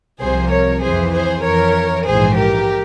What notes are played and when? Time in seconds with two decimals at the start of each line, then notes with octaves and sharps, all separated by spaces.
0.21 C2 C3 F3 G#4 C5
0.52 A#4 C#5
0.83 F2 E3 G#4 C5
1.14 G#4 C5
1.45 F2 E3 A#4 C#5
2.07 A#1 G#2 E3 G#4 C5
2.38 G4 A#4